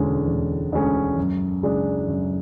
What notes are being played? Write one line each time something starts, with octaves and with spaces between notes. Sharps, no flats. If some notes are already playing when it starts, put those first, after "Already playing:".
Already playing: E1 D2 D3 G#3 C#4
E1
D2 D3 G#3 C#4
F#2
C#3 G#3 D4
F#2